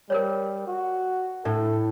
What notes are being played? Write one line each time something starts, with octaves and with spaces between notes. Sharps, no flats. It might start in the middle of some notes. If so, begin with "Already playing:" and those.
G3 A#4 C5 C#5
F#4
A2 D4 A4